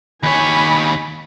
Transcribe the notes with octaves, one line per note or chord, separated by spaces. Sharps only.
D#2 C#5 G#5 B5